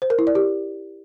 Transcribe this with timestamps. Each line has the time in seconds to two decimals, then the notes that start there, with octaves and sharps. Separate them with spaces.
0.02 C5
0.10 A#4
0.19 E4
0.27 D5
0.35 G4